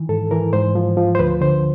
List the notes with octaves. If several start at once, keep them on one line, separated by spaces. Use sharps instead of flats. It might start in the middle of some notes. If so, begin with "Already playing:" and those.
Already playing: D#3 E3
G#2 A4
E3 A#4
G#2 C5
F3
F3
C5
D2 B4
D3 C5